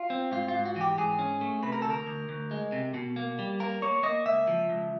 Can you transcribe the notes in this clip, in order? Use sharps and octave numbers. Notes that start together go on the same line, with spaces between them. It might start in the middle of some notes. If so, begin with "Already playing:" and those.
Already playing: F4
C4
G#2 F4
F4
G#2
F#4
E3 G4
G#2 G#4
C#4
A3
C3 B4
A#4
A4
D2
A#4
D2
D2
G#3
C3
B2
A#3
G3
A#3 A#4
A#3 C#5
A#3 D#5
C#2 E5
F3
C#2